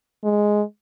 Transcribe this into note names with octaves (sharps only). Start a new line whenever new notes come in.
G#3